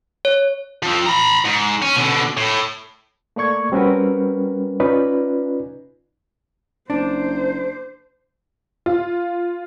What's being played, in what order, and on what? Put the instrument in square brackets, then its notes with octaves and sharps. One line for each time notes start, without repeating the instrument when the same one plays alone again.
[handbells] C#5
[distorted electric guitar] F3 C4
A#5 B5
G#2
C#4
B2 D3
A2
[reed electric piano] A3 A#3 D5 C#6 G#6
G3 C4 C#4 F#4 A#4 B4
C#4 D#4 F4 B4 D5
[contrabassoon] F#1 [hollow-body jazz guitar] D4 [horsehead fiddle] C5
[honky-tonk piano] F4